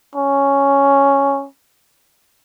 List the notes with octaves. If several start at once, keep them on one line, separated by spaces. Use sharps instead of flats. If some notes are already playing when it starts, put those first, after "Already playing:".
C#4